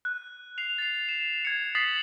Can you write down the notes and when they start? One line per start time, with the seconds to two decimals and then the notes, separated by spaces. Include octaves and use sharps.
0.05 F#6
0.58 C7 F7
0.78 A6 C7
1.09 E7
1.45 G#6 C#7
1.75 D#6 A6 B6 C7 F#7